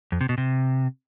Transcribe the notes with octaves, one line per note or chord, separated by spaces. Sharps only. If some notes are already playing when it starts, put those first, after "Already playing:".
F2
C3
B2
C3